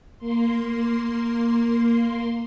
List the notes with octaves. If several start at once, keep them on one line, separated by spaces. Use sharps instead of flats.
A#3 C6